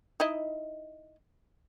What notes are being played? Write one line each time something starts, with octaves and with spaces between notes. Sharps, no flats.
D#4 E4 D#5